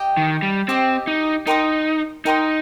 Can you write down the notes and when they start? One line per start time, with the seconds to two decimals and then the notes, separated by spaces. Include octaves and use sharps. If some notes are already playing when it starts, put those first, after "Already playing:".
Already playing: G4 D#5 G5
0.17 D#3
0.42 G3
0.68 C4 G4 D#5 G5
1.07 D#4
1.46 D#4 A#4 G5 C6 D#6
2.25 D#4 A#4 G5 C6 D#6